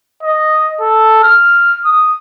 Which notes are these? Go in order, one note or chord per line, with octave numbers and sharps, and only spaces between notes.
D#5
A4
F6
D#6